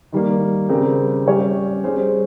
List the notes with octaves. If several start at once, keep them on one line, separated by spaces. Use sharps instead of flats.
D#3 G3 A#3
C#3 G3 C4 G4 A#4
G3 C#4 G4 C#5
G3 C#4 G#4 C5